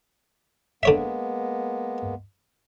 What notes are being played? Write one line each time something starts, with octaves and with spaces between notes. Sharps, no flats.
D3 G#3 A#3 B3 C#5 E5